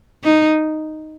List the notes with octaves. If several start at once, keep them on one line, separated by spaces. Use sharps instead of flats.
D#4